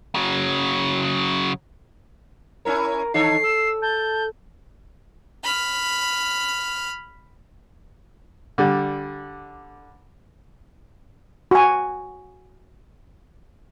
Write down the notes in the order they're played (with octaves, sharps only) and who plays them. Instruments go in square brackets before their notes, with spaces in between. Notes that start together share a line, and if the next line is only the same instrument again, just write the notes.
[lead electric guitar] C#3 F#3
[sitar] C#4 E4 C#5 [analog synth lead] A#4
[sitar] D#3 A4 C#5 [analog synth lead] D#4 [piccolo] C7
[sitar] A4 [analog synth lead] E6
[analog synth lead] A5 [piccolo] G6
[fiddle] B5 F6
[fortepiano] D3 G3
[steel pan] F#4 G#5